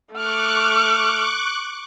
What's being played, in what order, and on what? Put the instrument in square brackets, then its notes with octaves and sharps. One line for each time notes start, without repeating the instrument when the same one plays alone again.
[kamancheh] A3 F6 [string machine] C#6 D6 F#6